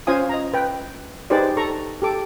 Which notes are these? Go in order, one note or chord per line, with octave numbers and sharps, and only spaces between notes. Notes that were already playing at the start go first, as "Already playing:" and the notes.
C#4 F4 C5 F5 G#5 D#6
D#5 A#5
B4 G5
D#4 G4 G#4 B4 C5 D5
A4 A#5 C#6
G4 A4 D6